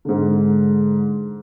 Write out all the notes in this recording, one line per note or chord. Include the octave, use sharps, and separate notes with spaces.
G#2 D3